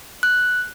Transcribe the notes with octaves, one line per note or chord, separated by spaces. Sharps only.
F#6